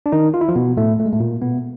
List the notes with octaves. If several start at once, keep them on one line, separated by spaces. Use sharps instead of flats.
D4
D#3 D#4
F4
E4
F3 F4
B2 B3
A2 A3
A3
G#3
A2 A3
A#2 A#3
B2 B3